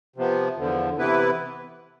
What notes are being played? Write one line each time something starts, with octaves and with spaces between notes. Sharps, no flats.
C3 F3 B3
E2 D3 F3
C3 E3 B3 E4 B4